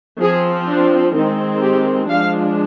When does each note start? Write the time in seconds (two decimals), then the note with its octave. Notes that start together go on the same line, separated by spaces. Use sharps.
0.21 F3 C4 G#4
0.67 D4
1.14 D#3 G#3 C4 D#4
1.62 G4
2.09 F3 G#3 D4 F5